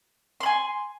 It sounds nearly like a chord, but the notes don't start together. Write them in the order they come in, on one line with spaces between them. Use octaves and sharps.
C6 B5 G#5